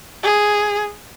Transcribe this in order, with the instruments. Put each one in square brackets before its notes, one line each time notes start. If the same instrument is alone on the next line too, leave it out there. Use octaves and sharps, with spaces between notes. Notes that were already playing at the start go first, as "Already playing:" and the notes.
[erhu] G#4